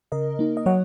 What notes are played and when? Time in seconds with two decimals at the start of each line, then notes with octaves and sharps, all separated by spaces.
0.12 C#3 A#4 D#5
0.39 A#3 D#4
0.57 D#5
0.66 F#3 C#5 F#5